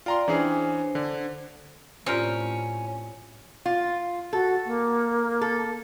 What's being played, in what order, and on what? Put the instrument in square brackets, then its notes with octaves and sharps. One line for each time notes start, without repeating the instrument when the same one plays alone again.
[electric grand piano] F4 A#5 C6 [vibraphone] D5 G5
[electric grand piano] E3 C#4 G#4 [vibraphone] D4 C5
[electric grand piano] D3
[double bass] A2 [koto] C4 A#4 [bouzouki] C#4 [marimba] F4 G4 D5
[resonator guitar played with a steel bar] F4
[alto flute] F#4 [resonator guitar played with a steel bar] A4
[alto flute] A#3
[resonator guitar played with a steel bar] A4